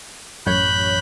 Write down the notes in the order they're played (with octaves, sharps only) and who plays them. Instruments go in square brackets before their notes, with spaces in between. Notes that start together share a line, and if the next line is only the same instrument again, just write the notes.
[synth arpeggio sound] A1 F#2 C#5 [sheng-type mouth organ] B5 F#6 G6